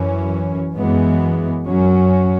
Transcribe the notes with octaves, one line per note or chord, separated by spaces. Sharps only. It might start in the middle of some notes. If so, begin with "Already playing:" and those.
Already playing: F#2 E3 C#4
F#2 E3 G#3 B3
F#2 F#3 C#4